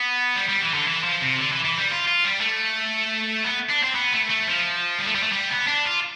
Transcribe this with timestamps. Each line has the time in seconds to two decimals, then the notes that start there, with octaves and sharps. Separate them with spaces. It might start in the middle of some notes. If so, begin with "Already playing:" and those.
Already playing: B3
0.36 G3
0.49 G3
0.62 E3
0.74 D3
0.87 E3
1.04 F3
1.21 C3
1.38 D3
1.51 E3
1.64 E3
1.77 G3
1.91 F4
2.07 F4
2.24 G3
2.41 A3
3.44 B3
3.70 D4
3.84 C4
3.96 B3
4.13 A3
4.30 A3
4.48 F3
4.98 G3
5.07 A3
5.15 G3
5.23 A3
5.32 G3
5.50 B3
5.67 D4
5.85 F4